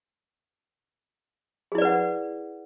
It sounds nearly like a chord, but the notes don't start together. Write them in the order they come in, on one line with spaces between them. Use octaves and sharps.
G#4 E4 D5 B4 F#5